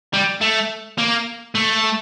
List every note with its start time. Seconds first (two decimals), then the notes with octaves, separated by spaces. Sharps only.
0.14 G3
0.41 A3
0.98 A#3
1.55 A3